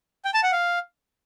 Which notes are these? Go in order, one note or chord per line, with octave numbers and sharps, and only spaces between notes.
G5
A5
F#5
F5